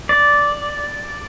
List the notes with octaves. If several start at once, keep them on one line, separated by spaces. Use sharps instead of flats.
D5